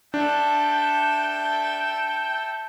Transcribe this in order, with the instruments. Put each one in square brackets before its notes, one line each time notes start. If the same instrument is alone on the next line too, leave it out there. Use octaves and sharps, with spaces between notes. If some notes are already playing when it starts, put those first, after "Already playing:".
[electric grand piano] D4 [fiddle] A4 E5 [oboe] G5